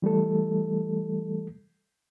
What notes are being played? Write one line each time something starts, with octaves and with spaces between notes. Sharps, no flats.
E3 G3 A3 A4